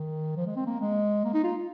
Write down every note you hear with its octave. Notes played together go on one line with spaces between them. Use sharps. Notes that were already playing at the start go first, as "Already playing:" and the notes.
Already playing: D#3
F3
G#3
C4
A#3
G#3
A#3
D#4
F4